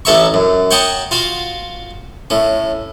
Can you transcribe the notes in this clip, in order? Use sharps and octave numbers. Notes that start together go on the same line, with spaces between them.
A1 A4 C#5 E5 A#5 C#6
F#2
C#5 F#5 G5 A5 A#5 D#6
F4 F#4 F5
A2 C#4